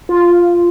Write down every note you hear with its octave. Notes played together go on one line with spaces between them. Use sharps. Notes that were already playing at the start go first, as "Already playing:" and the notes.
F4